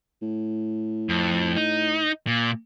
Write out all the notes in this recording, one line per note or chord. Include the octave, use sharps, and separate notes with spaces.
A2
F2
D#4
A#2